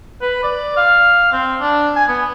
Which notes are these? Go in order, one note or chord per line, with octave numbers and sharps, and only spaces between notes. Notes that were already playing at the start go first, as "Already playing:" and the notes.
B4
D5
F5
C4
D4
G#5
B3